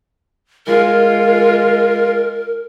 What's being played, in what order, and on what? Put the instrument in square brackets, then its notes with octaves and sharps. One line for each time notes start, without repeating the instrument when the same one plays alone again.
[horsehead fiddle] G#3 F4 [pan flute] A#4